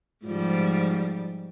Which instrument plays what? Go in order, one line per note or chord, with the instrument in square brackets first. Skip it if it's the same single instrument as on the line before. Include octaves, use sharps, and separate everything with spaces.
[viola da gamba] G#2 F3 G3